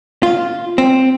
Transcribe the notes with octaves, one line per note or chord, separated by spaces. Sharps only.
F4
C4